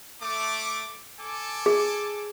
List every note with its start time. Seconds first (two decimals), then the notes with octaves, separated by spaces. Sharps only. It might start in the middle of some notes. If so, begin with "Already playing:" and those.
0.22 A3 D6
1.20 A4 G#5 D6
1.66 G#4